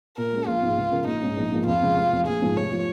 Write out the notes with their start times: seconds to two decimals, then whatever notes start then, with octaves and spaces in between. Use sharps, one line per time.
0.17 A#2 A#4
0.32 G#3 C#4
0.47 A#1 F4
0.62 G#2 F3 G#3
0.77 C#2
0.91 C#3 F3 C#4 A#4
1.07 A#1 D#4
1.22 G#2 G#3 C#4
1.37 A#1
1.51 G#2 F3 A#3
1.66 F2 F4
1.82 C#3 F3 G#3
1.96 F1
2.12 F2 F3
2.27 A#1 G#4
2.42 G#2 F3 G#3 F4
2.56 F1 C#5
2.72 F3